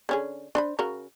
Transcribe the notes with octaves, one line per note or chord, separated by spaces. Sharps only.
D3 C#4 G#4
D4 C5 B5
C#3 F#4 A#4